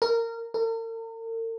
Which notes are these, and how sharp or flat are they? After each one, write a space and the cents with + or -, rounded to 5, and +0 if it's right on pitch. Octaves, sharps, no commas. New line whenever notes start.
A#4 -20
A#4 -45